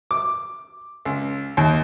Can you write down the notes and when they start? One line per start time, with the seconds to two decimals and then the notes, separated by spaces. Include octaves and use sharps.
0.11 D6
1.05 C#2
1.57 D#2